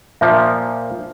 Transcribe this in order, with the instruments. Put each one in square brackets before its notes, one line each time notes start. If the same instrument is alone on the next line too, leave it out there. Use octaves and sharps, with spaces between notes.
[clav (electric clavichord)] A#2 F3 [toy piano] E5